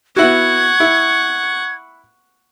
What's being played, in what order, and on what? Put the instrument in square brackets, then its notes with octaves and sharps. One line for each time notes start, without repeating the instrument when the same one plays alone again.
[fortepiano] B3 E4 F#4 [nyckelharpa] F#5 C#6 [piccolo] G#6
[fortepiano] E4